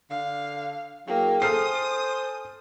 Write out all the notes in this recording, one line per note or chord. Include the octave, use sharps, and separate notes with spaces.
D3 F5
F#3 A#3 E4 G#4 G5
A4 C5 G#5 D#6 F6 C7